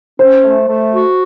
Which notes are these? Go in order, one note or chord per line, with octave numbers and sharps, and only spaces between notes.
C#4 C5
A3
A3
F#4